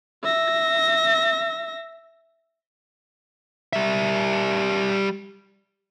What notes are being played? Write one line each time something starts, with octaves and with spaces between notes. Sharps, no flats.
E5 A#6
G3 E5